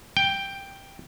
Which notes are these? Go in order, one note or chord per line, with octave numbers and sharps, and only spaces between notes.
G5